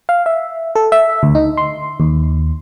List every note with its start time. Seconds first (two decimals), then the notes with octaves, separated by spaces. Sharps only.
0.09 F5
0.26 E5
0.75 A4
0.92 E5
1.23 D2
1.35 D#4
1.57 C6
2.00 D#2